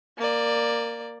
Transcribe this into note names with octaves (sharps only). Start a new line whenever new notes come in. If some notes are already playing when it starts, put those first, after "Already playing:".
A#3 D5